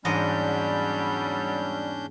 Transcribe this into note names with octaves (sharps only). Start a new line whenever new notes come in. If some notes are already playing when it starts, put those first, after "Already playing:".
E2 G#2 F#3 G3 C#4 D4 D#5 G6